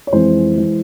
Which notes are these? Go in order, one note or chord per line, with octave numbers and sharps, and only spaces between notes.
C#5
F2 E3 G#3 C5
E3 G#3